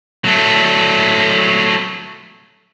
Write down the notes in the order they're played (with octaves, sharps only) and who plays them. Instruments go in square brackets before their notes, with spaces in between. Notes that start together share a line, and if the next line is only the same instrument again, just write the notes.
[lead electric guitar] F#3 A3